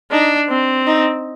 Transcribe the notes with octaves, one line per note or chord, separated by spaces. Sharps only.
D4 D#4
C4
D#4